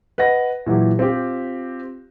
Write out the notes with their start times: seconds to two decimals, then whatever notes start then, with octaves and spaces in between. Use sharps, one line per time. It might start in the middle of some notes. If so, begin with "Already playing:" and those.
0.18 B4 D#5 F#5 A#6
0.66 A#2 E3 F#3 G4
0.99 C4 F4 G4